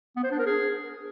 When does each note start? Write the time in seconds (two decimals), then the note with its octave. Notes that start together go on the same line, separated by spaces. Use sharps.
0.16 B3
0.24 C5
0.31 D4
0.39 A#4
0.46 G#4